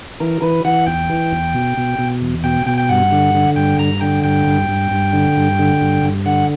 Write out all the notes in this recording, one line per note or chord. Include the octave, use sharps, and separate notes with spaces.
E3 A#4
E3 B4
E3 F#5
E2 G5
E3
E2
B2
B2
B2
E2
B2 G5
B2 G5
G5
G2 F#5
D3
D3
G2 G5
G2 A#5
D3 G5
G2 G5
G2
G2
G2
D3
G2
D3
G2
G2
D3 F#5